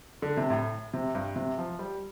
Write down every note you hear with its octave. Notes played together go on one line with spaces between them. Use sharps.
D3
C3
A2
C3
G2
C3
F3
G3